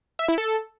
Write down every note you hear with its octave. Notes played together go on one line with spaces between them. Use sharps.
E5
E4
A4